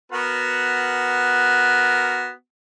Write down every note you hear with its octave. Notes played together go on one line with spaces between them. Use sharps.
B3 F#4 A#4